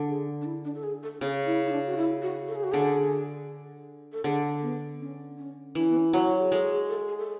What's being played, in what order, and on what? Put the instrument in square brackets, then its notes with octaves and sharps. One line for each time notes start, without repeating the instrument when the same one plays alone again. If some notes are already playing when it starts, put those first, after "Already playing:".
Already playing: [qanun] D3
[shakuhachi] G#4
D4
E4
D4
A4
G#4
A4
[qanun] C#3 [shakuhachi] G#4
[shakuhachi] E4
E4
D4
F#4
E4
F#4
A4
G#4
F#4
[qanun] D3 [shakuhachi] G#4
[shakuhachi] A4
[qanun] D3 [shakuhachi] G#4
[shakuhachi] B3
C#4
C#4
[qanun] E3 [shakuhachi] D4
[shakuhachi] C#4
B3
C#4
[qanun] F#3
[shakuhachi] F#4
G#4
[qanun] G#3 [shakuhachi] A4
[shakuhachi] G#4
A4
G#4
A4